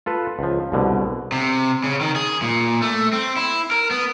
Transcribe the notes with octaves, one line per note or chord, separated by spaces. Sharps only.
F4 A4 B4
C#2 F3
C2 B2 D3
C3
C#3
D#3
G#4
A#2
A3
C4
E4
A#4
B3